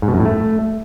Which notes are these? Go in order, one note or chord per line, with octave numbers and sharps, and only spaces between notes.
G#2
B2
F#2
A2
A3